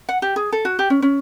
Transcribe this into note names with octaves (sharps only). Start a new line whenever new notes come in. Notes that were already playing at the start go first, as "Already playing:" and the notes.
F#5
G4
G#4
A4
F#4
G4
C#4
C#4